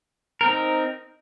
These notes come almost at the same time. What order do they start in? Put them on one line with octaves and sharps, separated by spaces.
A#4 C4 D#4